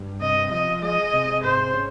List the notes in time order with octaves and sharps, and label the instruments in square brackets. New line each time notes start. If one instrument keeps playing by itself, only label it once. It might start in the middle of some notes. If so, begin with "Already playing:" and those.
Already playing: [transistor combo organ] G2
[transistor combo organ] C3 [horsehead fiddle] D#5
[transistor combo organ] F3 [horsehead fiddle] D#5
[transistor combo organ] G#3 [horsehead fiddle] D#5
[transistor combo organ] C3
[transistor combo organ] G#2 [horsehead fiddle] C5
[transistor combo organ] C#4